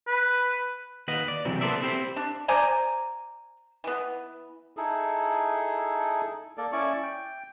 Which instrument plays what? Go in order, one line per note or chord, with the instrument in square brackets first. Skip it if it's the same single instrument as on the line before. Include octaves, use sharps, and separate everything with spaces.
[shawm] B4
[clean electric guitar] D#2 B4 D#5 F#5
D5
C3 E3 F#3 C4
A#3 B3 A4 C5 D5 E5
C4 E4 G4 A4 C5
[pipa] D4
C5 D5 G#5 A#5
E3 B3
[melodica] D#4 E4 G#4 A4
A#3 A4 D5
C#4 E4 D5 C#6
G5